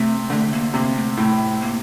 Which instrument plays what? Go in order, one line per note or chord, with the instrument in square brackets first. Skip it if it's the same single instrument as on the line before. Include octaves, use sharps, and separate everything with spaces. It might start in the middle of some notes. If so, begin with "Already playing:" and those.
Already playing: [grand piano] C3 [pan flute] A3
[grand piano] D3 [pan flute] A3
[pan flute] A#3
[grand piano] C3 [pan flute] A#3
[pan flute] A3
[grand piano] A2 [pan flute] A3
[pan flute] A#3